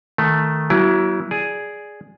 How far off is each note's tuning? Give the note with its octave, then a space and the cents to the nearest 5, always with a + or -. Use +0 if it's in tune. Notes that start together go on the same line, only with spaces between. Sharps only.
D#3 +0 A3 +0
F#3 +35 B3 -40 E4 +15
G#4 +0 D5 +0